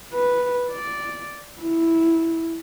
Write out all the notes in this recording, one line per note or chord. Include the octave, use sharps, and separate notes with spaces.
B4
D5
E4